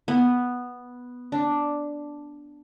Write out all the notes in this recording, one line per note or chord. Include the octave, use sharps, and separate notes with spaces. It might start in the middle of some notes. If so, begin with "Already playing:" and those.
B3
D4